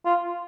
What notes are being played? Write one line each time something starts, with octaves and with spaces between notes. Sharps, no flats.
F4